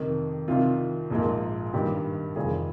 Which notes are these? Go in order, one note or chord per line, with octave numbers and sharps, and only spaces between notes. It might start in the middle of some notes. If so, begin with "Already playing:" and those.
Already playing: F2 C3 D#3
C2 C3 D#3 F4
A#1 G#2 F3 A#3
G2 D#3 G3 A#3 G4
F1 F2 D#3 G3 F4 G#4